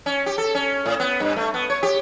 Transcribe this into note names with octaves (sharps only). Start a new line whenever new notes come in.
C#4
G4
A4
C#4
A2
B3
G2
A3
B3
C#5
G4